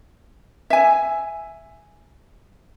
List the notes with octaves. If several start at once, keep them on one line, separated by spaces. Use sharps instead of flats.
E5 G#5